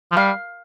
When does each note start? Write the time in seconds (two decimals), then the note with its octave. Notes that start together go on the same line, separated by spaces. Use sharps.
0.12 F3
0.16 G3 F5